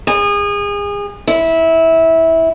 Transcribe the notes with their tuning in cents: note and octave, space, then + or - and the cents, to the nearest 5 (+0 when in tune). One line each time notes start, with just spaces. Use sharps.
G#4 -30
E4 -15